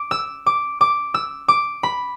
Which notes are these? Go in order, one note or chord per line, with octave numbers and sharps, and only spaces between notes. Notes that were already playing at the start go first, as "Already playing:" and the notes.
Already playing: D6
E6
D6
D6
E6
D6
B5